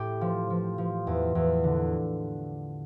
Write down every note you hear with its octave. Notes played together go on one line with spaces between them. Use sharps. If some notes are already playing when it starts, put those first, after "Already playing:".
Already playing: A2 G4
F3
F3
F3
E2
E2
D3